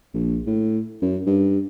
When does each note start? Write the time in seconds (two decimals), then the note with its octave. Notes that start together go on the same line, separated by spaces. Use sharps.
0.14 A#1
0.46 A2
1.02 F#2
1.26 G2